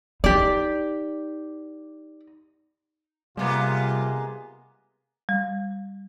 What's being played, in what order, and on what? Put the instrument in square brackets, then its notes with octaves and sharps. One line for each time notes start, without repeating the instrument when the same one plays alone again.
[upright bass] D#4 [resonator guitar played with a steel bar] G4 D5
[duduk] C3 [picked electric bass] G3 [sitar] G#3 A#3 B3 [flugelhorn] F4
[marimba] G3